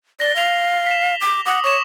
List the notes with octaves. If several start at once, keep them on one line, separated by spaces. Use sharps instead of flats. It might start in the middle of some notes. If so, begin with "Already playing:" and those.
D5 A#6 G7
F5 A#6 F7
B6 E7
D6
F#5 D6 D#6
C#5 C#6 E7